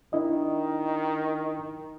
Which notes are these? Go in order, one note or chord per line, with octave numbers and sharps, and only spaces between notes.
D#3 D4 E4 D#5